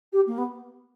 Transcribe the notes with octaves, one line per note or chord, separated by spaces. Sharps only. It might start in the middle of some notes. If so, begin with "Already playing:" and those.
G4
A#3
B3